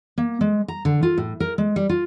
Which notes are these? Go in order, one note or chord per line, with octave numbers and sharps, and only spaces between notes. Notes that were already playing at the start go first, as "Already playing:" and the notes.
A#3
G#3
A#5
D3
F4
A2
A#4
G#3
G3
F4